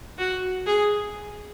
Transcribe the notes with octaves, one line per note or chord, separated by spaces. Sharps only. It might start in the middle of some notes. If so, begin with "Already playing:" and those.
F#4
G#4